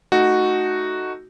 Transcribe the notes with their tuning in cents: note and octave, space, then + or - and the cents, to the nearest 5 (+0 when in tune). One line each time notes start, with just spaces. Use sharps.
A3 +0 D#4 +0 F#4 +0